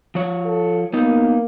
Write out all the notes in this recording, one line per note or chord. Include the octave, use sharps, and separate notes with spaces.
F3 C#5
A4
A#3 B3 D#4